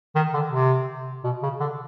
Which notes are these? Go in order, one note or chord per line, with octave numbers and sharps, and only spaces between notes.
D#3
D3
C3
B2
C#3
D3